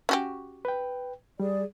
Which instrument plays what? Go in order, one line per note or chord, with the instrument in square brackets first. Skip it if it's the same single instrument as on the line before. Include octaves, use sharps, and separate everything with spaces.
[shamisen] C#4 F#4 G4
[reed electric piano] B4 G5
[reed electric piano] G3 [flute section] G#4 D5